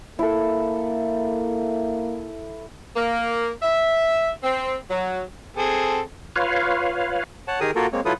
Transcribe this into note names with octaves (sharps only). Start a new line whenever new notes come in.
A#3 E4 A4
A#3
E5
C4
F#3
C4 G#4 A4
F4 B4 C#5 F5
C#5 F#5 A5
D#3 G4 G#4 A#4 G#5 D#6
A#3 F4 F#4 A4 A#4
G#3 A#3 C4 C#5
F#3 E4 F4 A4 B4 D#6